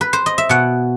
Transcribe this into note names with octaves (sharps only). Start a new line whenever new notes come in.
B4
C5
D#5
E5
B2 F#5